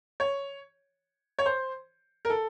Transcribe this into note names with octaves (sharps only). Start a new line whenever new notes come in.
C#5
C#5
C5
A#4
A4